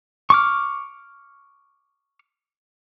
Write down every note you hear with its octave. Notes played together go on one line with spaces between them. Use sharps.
C#6 D6 F6